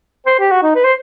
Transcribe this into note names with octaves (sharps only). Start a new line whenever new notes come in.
C5
G4
F#4
D#4
B4
C5